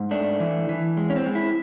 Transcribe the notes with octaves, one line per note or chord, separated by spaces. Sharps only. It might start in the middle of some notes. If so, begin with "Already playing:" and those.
Already playing: G#2
A3 D4
E3
E3
G#3
C#4
C4
G#3
E4